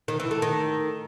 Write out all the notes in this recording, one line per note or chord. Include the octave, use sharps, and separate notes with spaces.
D#3
E3
A3
D#3